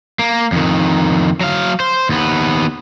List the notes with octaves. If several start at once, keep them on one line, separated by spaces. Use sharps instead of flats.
A#3
F2 D#3
F#3 F5
C5
D#2 B3